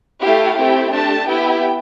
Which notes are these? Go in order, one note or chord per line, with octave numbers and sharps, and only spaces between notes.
A3 E4 G4 F5
A3 C4 E4 G4 G5
A3 D4 G4 A5
B3 E4 G4 G5